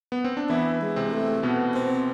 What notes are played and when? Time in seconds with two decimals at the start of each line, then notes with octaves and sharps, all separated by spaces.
0.12 B3
0.25 C4
0.37 D4
0.50 E3 B3 E4
0.81 G#3
0.96 C3 C4
1.12 A3
1.43 B2 B3
1.75 C4